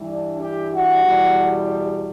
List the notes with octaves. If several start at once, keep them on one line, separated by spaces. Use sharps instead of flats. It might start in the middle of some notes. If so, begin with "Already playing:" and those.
Already playing: G2 E3 G3
D4
G4
F#4
E2 B2 G3